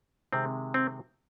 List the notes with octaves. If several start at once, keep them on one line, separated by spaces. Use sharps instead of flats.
C3 D#3 G#3 C4
C4